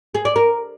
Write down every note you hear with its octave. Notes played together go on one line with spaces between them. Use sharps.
G#4
D5
A#4